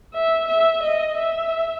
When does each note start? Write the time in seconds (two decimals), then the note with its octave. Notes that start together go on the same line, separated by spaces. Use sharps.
0.14 E5
0.48 E5
0.83 D#5
1.18 E5